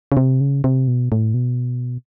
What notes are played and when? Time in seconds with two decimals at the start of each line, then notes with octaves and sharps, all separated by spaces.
0.12 C#3
0.17 C3
0.41 C#3
0.64 C3
0.88 B2
1.12 A2
1.34 B2